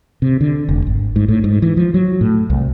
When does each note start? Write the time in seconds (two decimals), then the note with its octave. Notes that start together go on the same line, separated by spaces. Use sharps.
0.22 C3
0.41 D3
0.69 F1
0.87 G#1
1.16 G#2
1.28 A2
1.44 G#2
1.62 E3
1.77 F3
1.94 F#3
2.21 A2
2.50 C2